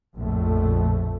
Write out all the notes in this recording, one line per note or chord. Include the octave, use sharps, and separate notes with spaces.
A#1 F2 A2 A3